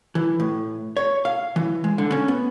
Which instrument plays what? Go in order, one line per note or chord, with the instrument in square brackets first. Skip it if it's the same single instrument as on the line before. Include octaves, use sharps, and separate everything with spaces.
[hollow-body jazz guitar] E3
A2
C#5
F5
E3
G#3
D3
C#4
B3